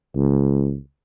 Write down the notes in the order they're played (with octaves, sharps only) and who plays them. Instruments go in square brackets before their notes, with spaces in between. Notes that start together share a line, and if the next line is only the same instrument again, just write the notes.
[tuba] C#2